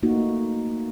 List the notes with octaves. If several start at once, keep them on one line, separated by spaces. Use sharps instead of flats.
A3 A#3 D#4 F#4